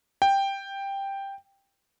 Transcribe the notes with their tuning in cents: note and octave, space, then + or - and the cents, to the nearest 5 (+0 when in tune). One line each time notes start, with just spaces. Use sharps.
G5 +5